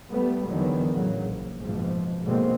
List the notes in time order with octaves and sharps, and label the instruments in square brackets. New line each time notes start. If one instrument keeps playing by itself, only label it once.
[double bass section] G3 A3 B3
E2 D3 D#3 F#3 B3
A2 C#3 F#3
A#1
F#1 G#2 B2 F3
G#2 B2 D3 G#3 A#3 C4